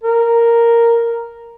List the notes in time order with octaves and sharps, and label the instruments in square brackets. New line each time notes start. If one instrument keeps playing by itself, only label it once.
[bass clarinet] A#4